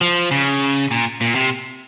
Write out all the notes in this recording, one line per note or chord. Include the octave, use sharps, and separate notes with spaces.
F3
C#3
A#2
A#2
C3